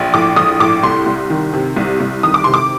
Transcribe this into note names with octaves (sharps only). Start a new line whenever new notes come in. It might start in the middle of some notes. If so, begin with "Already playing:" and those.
Already playing: A#1
A2 D6
A#1 D#6
A2 D6
C2 C6
C2
D#3
C3
C2
C2
D#3 D#6
D6
C3 C6
D6